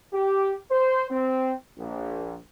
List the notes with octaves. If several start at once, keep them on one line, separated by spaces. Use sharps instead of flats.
G4
C5
C4
A#1